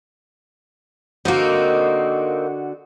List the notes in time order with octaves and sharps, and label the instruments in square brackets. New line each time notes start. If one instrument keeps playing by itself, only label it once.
[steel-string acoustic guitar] D3 F#4 [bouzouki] A#3 C4 D#4